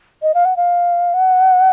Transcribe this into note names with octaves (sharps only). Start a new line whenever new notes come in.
D#5
F5
F#5
F5
F#5